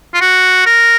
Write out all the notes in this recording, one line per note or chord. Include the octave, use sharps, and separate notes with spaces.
F4
F#4
A#4